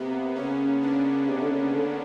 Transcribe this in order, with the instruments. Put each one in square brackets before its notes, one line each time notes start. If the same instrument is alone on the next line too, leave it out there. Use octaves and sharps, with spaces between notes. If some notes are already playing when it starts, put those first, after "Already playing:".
Already playing: [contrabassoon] C3 [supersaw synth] A#3 B3
[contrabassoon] C#3 [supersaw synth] C#4
[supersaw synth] D4
[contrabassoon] C3
D3
C#3
D3